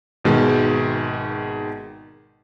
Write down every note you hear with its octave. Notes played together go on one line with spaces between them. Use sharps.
G#1 B2 D#3 G#3